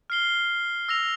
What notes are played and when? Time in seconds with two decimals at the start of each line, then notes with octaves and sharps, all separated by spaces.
0.10 F6 C7 G7
0.89 E6 A#6 F7